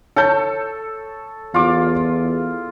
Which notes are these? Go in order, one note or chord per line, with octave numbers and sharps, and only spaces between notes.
A4 C#5 A5 G6
E2 F4 D6